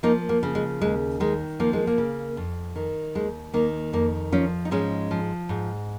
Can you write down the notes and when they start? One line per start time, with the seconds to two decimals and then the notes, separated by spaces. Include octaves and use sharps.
0.03 F3 A#3 D#4
0.29 A#3
0.43 C#3
0.55 G#3
0.81 D#2 G#3
1.20 D#3 G#3
1.60 F3 A#3
1.73 G#3
1.87 A#3
1.98 C#3
2.37 F2
2.76 D#3
3.15 D#2 G#3
3.54 D#3 A#3
3.93 F2 A#3
4.32 F3 C#4 F4
4.65 D#4
4.71 G#2 G#3 C#4
5.11 F3
5.49 G#2